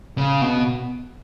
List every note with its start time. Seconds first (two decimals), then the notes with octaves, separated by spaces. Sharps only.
0.18 C#3
0.41 B2